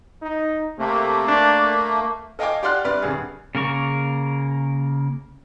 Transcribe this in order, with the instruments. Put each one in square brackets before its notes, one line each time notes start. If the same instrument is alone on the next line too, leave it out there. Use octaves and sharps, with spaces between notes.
[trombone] D#4
[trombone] C3 [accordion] A3 A#3
[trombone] D4
[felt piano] A4 D#5 F5 G5 G#5 D6
G4 D5 F#5 C6 F6 F#6
G2 C3 B4 D5 F6
D#1 G2 G#4
[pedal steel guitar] C#3 A#3 A#4 C#6